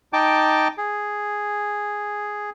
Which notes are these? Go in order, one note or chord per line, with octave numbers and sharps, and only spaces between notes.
D#4 G5 A5 D6
G#4